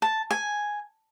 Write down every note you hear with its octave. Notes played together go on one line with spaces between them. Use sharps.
A5
G#5